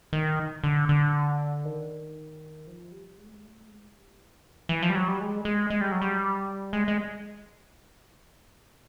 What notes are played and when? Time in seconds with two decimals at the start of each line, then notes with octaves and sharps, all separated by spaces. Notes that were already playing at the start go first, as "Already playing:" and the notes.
0.13 D#3
0.64 D3
0.89 D3
1.65 D#3
2.67 F3
2.92 G3
3.18 G#3
3.25 A3
3.33 G#3
3.43 A3
3.68 G#3
3.94 G3
4.19 E3
4.40 D3
4.45 D#3
4.69 E3
4.82 F3
4.90 G3
4.95 F#3
5.08 G3
5.21 G#3
5.45 G#3
5.70 G#3
5.81 G3
5.92 F#3
6.02 G3
6.73 G#3
6.88 G#3